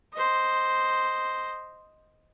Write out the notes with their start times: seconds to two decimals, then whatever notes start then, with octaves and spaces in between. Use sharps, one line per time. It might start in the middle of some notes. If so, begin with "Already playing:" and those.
0.14 C5 D#5